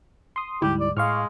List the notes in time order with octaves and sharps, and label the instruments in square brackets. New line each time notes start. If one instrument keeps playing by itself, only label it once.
[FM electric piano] C6 D#6
[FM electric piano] D2 G#2 G3 [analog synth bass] E4 [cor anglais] G4
[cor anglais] D5
[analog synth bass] A2 [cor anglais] G#3 [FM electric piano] F5 C#6 F6